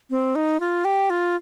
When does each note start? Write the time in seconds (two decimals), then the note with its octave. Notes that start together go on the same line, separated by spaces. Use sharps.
0.10 C4
0.35 D#4
0.60 F4
0.85 G4
1.10 F4